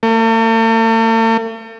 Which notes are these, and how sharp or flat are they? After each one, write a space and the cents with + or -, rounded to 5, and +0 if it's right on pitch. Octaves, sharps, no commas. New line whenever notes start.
A3 +45